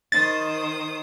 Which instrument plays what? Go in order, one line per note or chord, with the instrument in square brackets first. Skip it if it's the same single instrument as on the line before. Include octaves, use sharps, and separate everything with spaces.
[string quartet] D#3 C5 D#6 [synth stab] A6